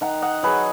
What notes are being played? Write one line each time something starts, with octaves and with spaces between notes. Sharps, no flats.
D#3 F#5 A#5
D#5 F#5
F#3 G#4 B4